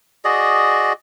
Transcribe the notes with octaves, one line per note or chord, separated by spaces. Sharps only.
F#4 G#4 D5 D#5